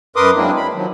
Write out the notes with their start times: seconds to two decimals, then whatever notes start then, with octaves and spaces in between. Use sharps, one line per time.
0.16 F#2 A#4 B4 C6 D6 D#6
0.36 F#3 G#3 A#3 C4 D4 E4
0.56 B5
0.74 D#3 F3 F#3